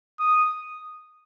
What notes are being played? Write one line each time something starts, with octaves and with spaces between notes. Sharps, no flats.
D#6